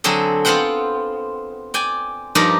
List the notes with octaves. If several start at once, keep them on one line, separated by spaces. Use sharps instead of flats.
D3 F#3 C4 G#4 A4
B3 C4 F4 C5 F#5 G5
D5 G5 G#5
G2 F3 D#4 A#4 D5